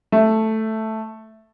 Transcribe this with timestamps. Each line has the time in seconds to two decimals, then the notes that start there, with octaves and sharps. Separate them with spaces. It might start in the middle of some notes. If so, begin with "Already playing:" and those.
0.12 A3